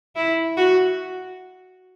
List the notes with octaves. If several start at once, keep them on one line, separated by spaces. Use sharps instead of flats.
E4
F#4